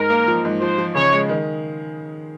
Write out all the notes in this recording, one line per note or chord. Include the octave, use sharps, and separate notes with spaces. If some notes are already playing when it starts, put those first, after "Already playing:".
Already playing: G#2 A#4
A#3
F3
G#2
F3 C5
F3
C#3 C#5
G#3
D#3